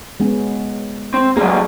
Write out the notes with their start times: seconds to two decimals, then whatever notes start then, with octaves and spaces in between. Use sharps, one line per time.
0.20 G#3 B3 C#4
1.14 C4
1.37 F#3 G3 A#3 G#4